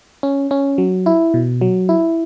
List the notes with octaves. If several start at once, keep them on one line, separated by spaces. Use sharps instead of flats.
C#4
C#4
F#3
E4
B2
F#3
E4